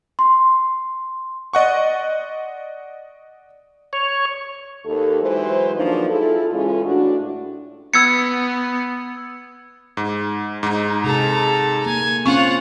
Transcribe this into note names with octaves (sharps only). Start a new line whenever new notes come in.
C6
D5 D#5 F#5 C#6
C#5
D#2 A4
E3 F#3 G#3 B4 C5
D#3 F3 F#3 A#3 D4 D#4
E4 F4 G#4 A4
C#3 E3 G#3 C#4 F4 A4
A2 D4 F#4
B3 E6 G#6 C#7
G#2
G#2 D#4
C3 G#4 A4 A#5
A#3 G#5
C4 C#4 F4 F#5 C#6